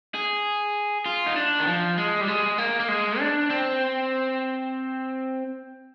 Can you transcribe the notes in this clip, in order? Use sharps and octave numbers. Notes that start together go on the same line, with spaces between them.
G#4
F4
D#4
D4
D#3
F3
G#3
G3
G#3
A#3
A#3
G#3
D4
C4